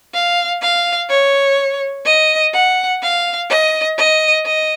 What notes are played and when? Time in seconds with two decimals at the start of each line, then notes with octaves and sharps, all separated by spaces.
0.14 F5
0.62 F5
1.09 C#5
2.06 D#5
2.53 F#5
3.02 F5
3.50 D#5
3.97 D#5
4.46 D#5